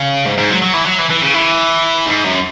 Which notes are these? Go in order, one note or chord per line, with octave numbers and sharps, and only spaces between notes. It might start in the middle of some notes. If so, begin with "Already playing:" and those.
Already playing: C#3
G#2
G#2
F#3
F#3
E3
F#3
E3
E3
C#3
E3
G#2
F#2